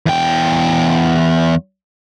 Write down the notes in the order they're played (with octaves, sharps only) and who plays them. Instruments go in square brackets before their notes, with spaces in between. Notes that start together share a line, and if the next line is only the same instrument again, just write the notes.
[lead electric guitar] E2 G5